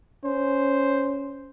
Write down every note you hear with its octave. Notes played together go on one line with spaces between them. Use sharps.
C#4 C5